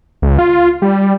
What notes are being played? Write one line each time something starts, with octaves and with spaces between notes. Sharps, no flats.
C#2
F4
G3